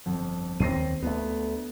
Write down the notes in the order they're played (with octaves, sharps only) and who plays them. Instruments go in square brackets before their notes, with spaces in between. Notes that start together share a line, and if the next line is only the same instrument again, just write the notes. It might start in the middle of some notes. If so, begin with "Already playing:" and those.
[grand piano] G1 F2
[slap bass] D#2 C4 [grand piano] A#6 C7 D#7
[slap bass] D2 A3 [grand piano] B3